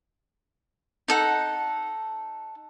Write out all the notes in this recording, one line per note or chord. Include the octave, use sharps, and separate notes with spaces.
D#4 A4 F#5